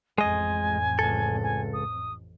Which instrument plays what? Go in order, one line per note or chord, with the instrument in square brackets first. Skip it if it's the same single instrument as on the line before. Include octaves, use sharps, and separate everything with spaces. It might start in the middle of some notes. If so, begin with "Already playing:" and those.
[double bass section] A1 F2 [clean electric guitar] G#3 D#5 [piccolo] G#5
[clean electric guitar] C#2 A4
[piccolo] G#5
D#6